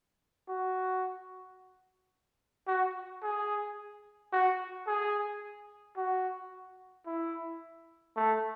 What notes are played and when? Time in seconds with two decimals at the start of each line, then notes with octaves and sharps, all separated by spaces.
0.49 F#4
2.67 F#4
3.23 G#4
4.32 F#4
4.87 G#4
5.97 F#4
7.06 E4
8.17 A3